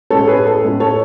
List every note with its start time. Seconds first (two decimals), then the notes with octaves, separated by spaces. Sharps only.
0.10 A2 G#3 C#4 A4 C#5
0.27 G#4 B4
0.45 A4
0.63 A2 G#3 C#4
0.80 A4 C#5